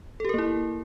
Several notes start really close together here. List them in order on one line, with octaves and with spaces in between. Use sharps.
A4 G4 A#4 A#3 E4